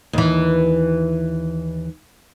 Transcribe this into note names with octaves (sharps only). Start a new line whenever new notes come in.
D#2 E3